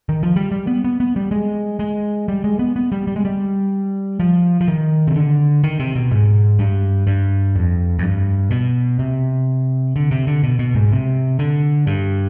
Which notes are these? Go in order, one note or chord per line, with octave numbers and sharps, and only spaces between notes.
D#3
F3
G3
G3
B3
B3
B3
G3
G#3
G#3
G3
G#3
B3
B3
G3
G3
G#3
G3
F3
F3
D#3
C3
D3
D#3
C3
B2
G#2
G2
G2
F2
F2
G2
B2
C3
D3
C3
D3
B2
B2
G#2
C3
D3
G2